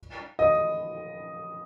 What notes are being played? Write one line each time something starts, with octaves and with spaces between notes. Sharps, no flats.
D#5